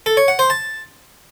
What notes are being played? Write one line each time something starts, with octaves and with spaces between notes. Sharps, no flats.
A4
C#5
F#5
C5
A5